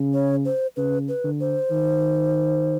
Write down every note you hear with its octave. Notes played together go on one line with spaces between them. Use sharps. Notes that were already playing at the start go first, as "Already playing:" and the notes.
Already playing: C#3
C#5
C5
C#3 B4
B4
D3
C5
D#3